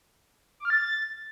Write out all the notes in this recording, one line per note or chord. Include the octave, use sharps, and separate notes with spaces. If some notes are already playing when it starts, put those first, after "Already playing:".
D6
F6
A6